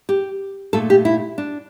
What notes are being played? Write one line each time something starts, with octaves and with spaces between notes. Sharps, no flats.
G4
A#2 A3 A4
G4
E4
D4